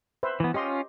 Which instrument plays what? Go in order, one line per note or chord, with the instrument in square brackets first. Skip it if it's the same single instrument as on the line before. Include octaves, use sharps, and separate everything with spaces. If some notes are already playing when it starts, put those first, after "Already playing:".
[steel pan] B4 C5 E5
[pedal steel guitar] E3 B3
[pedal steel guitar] C#4 F4 [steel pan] G4 D#5 C6